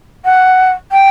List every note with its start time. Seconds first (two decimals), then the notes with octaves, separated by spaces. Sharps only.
0.25 F#5
0.92 G5